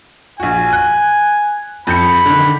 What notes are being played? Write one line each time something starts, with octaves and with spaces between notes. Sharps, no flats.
A#1 F#4 G#5
F#6
F2 B5 G6 C#7
D3 D#3